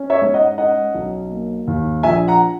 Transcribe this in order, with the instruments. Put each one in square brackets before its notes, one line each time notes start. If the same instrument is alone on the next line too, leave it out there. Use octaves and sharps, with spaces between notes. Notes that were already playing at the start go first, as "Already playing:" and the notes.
Already playing: [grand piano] C#4
C#5 E5
G#2
D#5 F#5
C#4 D#5 F#5
B1
A#3
D#2
A#1 E5 G#5
F#5 A#5